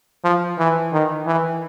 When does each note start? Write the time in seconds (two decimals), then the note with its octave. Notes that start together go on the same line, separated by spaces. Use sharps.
0.24 F3
0.58 E3
0.93 D#3
1.26 E3